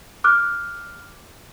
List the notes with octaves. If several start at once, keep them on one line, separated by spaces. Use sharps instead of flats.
D6 F6 F#6